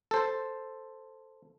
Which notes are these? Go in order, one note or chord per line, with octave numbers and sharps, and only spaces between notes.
A4 C5